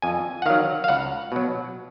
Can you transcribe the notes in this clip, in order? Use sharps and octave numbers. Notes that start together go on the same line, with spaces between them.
F2 G#5
F#5
D#3 F#3 F5
F5
C#2 F#5
B2 F#3